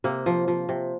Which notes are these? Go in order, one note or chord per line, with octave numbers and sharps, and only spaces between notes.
C3 A#3
F3
F3
C3